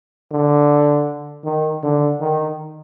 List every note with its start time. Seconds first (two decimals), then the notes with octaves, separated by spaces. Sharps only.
0.32 D3
1.44 D#3
1.83 D3
2.20 D#3